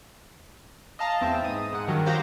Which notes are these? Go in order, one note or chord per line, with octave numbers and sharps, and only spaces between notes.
D#5 F5 A5 A#5
E2 C4 E5
G#2 D#6
G#2 F#5
G2 D#3 F#3
F#4 G4 C5 F5 A#5